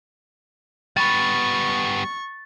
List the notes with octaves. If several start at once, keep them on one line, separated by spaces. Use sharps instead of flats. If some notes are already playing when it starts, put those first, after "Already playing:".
G3 B3 C#6 A6